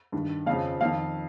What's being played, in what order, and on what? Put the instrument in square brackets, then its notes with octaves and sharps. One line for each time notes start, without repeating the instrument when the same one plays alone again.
[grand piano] G2 D#3
F2 C#3 F3 F5
F2 D#3 F5